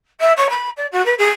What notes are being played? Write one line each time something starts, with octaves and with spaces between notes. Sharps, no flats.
E5
C#5
B5
D5
F#4
B4
G#4